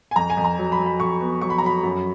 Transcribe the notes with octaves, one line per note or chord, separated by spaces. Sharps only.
G#5
F2 A#5
G#5
F2
A#5
F#3
B5
F#3
B5
F2 C#6
B3
F#3 C#6
B5
A#5
F#3 B5
F#2